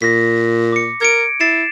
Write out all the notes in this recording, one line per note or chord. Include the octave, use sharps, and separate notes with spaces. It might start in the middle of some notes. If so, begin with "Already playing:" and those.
A#2 A#6 B6
D6 C#7
A#4 G#6 C#7 D7
E4 A6 C7 E7